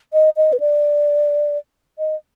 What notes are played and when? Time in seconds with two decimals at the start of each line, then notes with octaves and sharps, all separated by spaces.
0.13 D#5
0.37 D#5
0.53 B4
0.60 D5
1.99 D#5